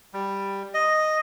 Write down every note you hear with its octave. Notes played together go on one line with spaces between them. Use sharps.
G3
D#5